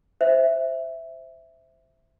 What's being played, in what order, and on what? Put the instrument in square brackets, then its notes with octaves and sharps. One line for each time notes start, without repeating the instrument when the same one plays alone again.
[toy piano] C5 E5